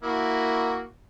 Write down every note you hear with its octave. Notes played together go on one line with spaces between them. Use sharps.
A#3 E4 F#4